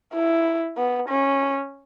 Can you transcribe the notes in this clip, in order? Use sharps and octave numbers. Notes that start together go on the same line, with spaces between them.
E4
B3
C#4